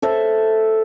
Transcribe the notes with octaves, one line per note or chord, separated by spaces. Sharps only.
A4 C5 E5